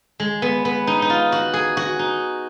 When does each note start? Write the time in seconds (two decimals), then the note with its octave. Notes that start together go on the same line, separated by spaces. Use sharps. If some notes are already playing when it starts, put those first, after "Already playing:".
0.20 G#3
0.42 B3
0.65 B3
0.87 D#4
1.02 D#4
1.10 F4
1.32 F#4
1.53 G#4
1.77 F#4
1.99 D#4